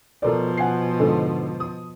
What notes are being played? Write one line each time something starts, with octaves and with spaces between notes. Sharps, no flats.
B2 F3 A4 A#4 D5
F#5 G#5 C7
G#2 D3 A4
D#6